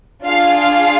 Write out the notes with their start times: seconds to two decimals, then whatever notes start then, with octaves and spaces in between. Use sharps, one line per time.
0.24 D4 F4 G#4 F5
0.60 F5